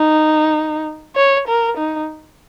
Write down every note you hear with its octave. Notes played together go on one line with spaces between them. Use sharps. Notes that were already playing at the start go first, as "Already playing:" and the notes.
Already playing: D#4
C#5
A#4
D#4